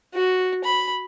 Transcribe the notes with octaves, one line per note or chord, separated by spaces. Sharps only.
F#4
B5